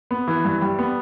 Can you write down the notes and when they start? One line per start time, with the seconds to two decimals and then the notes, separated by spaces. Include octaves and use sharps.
0.11 B3
0.27 E3
0.45 G2
0.62 G3
0.79 B3